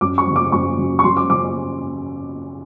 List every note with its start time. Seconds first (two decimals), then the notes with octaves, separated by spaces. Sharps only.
0.01 F#2 D6
0.18 C#6
0.27 C#3 F#3
0.36 D6
0.52 F#2 C#6
0.78 C#3 F#3
0.99 C#6
1.04 F#2 C6
1.17 D6
1.30 C#3 F#3 D6